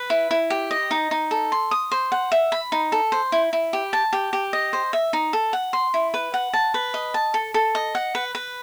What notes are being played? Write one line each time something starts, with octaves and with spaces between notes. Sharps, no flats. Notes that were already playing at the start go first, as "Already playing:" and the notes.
Already playing: B4
E4
E4
G4
D#5
D#4
D#4
A4
C6
D#6
C5
F#5
E5
B5
D#4
A4
C5
E4
E4
G4
A5
G4
G4
D#5
C5
E5
D#4
A4
F#5
C6
E4
B4
F#5
A5
B4
D#5
A5
A4
A4
D#5
F#5
B4
B4